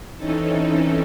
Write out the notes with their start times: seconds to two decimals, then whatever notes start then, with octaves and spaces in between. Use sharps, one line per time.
0.16 E3 C4 C#4 D#4 A4